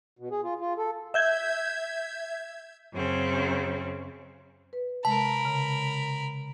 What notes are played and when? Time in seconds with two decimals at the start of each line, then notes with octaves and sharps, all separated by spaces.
0.19 B2
0.31 G#4
0.43 F4
0.61 F4
0.78 A4
1.14 E5 G6 G#6
2.94 F#2 C#3 C4
4.73 B4
5.05 C3 G#3 A#4 A5 B5
5.45 C#3